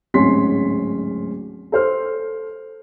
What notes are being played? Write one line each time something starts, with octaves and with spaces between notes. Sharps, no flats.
D1 G#1 C#4 C6 B6
A4 C5 F6